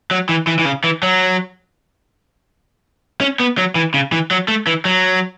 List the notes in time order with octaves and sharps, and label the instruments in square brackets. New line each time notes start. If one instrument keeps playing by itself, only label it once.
[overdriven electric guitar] F#3
E3
E3
E3
C#3
E3
F#3
C#4
B3
F#3
E3
C#3
E3
F#3
A3
E3
F#3